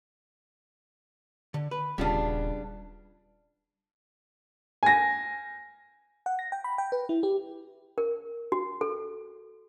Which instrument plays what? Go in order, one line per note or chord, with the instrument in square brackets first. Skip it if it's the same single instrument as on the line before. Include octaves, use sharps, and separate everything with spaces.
[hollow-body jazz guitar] D3
B4
[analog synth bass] D#1 [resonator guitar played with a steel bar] C#3 B3 D4 [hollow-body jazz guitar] G3 F4 G#4
[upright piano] G#5 A#6
[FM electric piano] F#5
A#6
G5
B5
G5
B4
E4
G4
[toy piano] A#4
F#4
A4